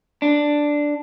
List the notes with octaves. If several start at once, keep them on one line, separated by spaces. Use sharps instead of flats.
D4